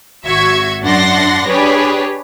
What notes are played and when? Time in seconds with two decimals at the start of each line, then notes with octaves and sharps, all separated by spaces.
0.25 G#1 F#4 E5 C#6 G#6
0.83 F#2 D4 F#5 C6 A6 A#6
1.47 D4 G4 G#4 B4 C#5